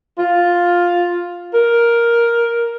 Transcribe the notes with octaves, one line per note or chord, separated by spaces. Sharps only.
F4
A#4